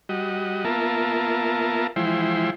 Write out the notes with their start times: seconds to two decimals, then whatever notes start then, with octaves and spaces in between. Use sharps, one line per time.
0.09 G3 F#4 D#5
0.65 A#3 B3 F4 A#4 E5 A5
1.96 E3 F3 G#3 E4 C5 G5